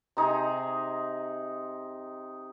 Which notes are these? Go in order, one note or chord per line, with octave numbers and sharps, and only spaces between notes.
C3 D#4 G#4 A#5